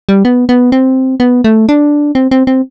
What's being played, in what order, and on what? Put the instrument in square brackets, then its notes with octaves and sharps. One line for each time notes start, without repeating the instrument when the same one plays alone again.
[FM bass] G3
B3
B3
C4
B3
A3
D4
C4
C4
C4